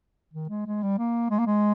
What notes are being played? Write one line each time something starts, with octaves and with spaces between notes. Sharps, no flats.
D#3
G#3
G#3
G3
A#3
G#3
A#3
G#3